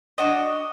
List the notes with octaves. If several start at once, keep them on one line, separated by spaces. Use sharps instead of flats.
D4 F#4 D#5